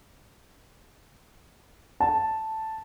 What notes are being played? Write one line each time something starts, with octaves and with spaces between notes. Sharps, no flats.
A5